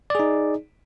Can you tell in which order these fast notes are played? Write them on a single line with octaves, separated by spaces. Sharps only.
D5 G#4 D#4